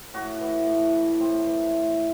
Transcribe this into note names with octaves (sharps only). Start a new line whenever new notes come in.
A2 F#4
E3
A2
E3
A2 C4
E3
A2